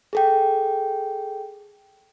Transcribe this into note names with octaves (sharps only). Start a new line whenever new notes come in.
G#4 A4 G5